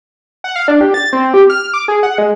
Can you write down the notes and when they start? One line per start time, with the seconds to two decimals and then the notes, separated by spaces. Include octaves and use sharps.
0.44 F#5
0.56 F5
0.68 D4
0.81 G4
0.94 A6
1.13 C4
1.34 G4
1.50 F6
1.74 D6
1.88 G#4
2.03 F#5
2.18 G#3